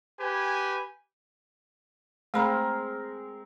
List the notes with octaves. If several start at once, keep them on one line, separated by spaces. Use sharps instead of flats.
G4 B4 G#5
G#3 A3 C4 A#4 B5 C6